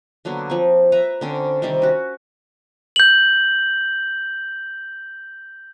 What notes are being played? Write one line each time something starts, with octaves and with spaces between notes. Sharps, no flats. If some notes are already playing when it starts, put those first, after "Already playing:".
D3 F#3 A#3 B3
F3 C4 C#6
B4 E5 A#5
D3 C4 C#4
C3 D#3 G3 C4
C#4 F#4
G6 F#7